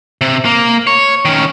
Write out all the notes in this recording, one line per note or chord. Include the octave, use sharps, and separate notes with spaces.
C3
A#3
C#5
D#3 C#4